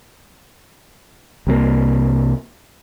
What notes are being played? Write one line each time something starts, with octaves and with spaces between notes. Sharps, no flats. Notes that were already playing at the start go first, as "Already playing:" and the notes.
C2 C3 F3 A#3